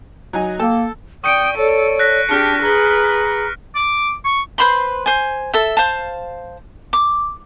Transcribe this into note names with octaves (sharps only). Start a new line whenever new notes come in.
F#3 D#4 G#5
A#3 A4 G5 A5
D5 G5 C#6 D#6 C#7 D7
A4 C#5 D5
F#6 A#6 B6
D4 G4 G#4 A5 F6 C#7
G#4 B4 A#5
D6
C#6
B4 C5 B5 C6
C5 G#5
A4 E5
C5 F5 A5
D6